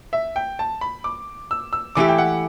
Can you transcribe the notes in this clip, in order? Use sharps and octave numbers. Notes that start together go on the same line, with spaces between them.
E5
G5
A5
B5
D6
E6
E6
E3 A3 E4 G4 D6
G5
F#5